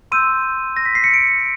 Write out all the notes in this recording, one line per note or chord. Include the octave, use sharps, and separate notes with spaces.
C6 E6 G6 D#7
A#6
B6
C7
C#7
D7